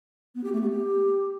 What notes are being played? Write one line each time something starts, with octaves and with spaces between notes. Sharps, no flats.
B3
G4
A3
B3
G4